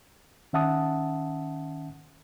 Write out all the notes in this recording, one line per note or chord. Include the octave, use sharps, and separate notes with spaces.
D#3 C#4 E5 F#5 A5 D#6